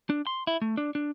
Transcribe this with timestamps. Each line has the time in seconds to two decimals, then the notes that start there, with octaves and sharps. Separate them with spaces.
0.10 D4
0.27 C6
0.47 E4
0.62 A3
0.77 D4
0.95 D4